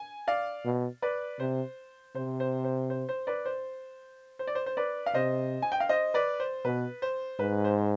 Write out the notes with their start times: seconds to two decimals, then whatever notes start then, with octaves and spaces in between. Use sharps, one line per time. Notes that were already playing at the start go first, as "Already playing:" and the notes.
Already playing: G#5
0.27 D5 F5
0.65 B2
1.02 B4 D5
1.40 C3 C5
2.15 C3 C5
2.40 C5
2.64 C5
2.90 C5
3.09 C5
3.27 B4 D5
3.45 C5
4.39 C5
4.47 D5
4.55 C5
4.66 C5
4.77 B4 D5
5.06 F5
5.14 C3 C5 D#5
5.62 G#5
5.72 G5
5.80 F5
5.89 C5 D#5
6.14 B4 D5
6.40 C5
6.65 B2 B4
7.02 C5
7.39 G#2 B4
7.64 C5